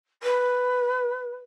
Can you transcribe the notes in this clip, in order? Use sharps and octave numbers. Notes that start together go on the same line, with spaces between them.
B4